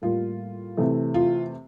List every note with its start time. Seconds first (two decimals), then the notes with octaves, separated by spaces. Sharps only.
0.02 A2 G3 A#3 F4
0.77 C3 E3 A3
1.14 F4